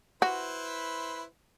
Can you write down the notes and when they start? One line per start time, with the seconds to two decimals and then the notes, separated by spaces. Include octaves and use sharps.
0.22 E4 F#4 B4 C5